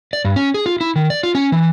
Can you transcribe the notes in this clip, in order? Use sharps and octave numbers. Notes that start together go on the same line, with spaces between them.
D5
G2
C#4
G#4
F4
E4
D#3
D5
F4
C#4
E3